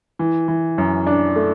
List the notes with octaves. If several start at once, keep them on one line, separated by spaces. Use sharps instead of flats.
E3
E3
F#2
D4
A3